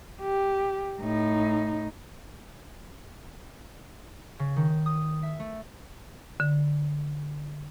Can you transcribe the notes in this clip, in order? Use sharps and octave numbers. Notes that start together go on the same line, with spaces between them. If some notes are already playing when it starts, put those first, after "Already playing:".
G4
A2 D#4
C#3
D#3
D#6
E5
A3
D3